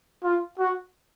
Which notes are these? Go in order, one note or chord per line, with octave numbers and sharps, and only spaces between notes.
F4
F#4